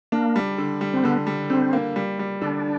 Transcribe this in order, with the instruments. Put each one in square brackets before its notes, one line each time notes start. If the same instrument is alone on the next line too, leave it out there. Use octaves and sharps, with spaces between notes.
[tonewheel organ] A#3 [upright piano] D4
[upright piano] G3
D3
G3
[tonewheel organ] C4
[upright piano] D3 [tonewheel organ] B3
[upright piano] G3
[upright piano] D3 [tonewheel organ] C4
[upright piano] A#3
G3
G3
[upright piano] D3 [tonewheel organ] D4